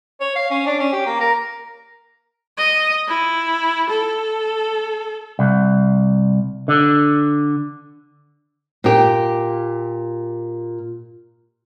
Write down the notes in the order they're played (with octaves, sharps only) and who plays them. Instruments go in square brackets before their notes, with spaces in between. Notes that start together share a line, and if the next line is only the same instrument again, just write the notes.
[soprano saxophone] C#5
F5
C#4
D4
C#4
G4
A#3
A#4
[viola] D#5
E4
A4
[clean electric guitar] C2
D3
[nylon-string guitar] A#2 G4